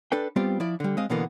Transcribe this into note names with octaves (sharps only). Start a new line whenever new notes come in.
D4 A4 B4 G5
G3 B3 C4 F4 D5
F3 E4 D5
D3 G3
G#3 C4 D#5 F5
B2 D3 E3 A#3 B3